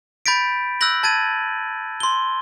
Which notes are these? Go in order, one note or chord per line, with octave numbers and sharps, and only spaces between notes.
B5 G6 A6 B6 D7
E6 F#6 G6 A#6 F#7
A5 G#6 A6 D#7
C6 G7